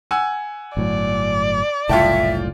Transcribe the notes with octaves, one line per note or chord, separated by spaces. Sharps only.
F#5 G#5 E6
G1 A2 F#3 D5
F#1 C2 A2 F4 E5 G5 A5